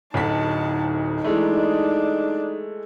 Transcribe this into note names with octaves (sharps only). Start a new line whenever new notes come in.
D1 D2 D#4 A5 B6
E3 G#3 A3 D4